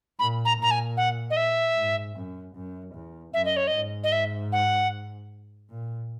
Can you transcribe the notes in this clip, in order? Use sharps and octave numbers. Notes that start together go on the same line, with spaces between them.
A#2 B5
A#5
A#2 A#5
G#5
F#5
D#5
E5
G#2
F#2
F#2
E2
F#2 E5
D#5
C#5
D#5
G#2
D#5
E5
F#5
A#2